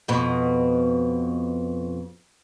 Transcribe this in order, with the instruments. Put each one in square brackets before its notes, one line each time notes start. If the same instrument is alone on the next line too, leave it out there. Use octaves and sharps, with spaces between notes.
[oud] F2 B2